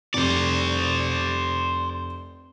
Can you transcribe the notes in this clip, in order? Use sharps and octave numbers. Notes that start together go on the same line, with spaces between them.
F1 C5 D5